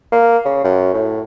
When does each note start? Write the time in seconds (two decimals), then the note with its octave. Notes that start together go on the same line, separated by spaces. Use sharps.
0.12 A#3
0.45 C#3
0.64 F#2
0.94 A2